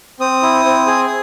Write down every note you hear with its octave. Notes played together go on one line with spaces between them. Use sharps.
C4 D#6
E4
C4
G#4